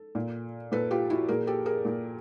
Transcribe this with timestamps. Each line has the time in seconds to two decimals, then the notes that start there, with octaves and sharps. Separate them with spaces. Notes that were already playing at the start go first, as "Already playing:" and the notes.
Already playing: A4
0.15 A#2
0.72 A#2 A4 B4
0.91 F4 G4
1.10 E4 F#4
1.28 A#2 G#4 A#4
1.47 G4 A4
1.66 G#4 A#4
1.85 A#2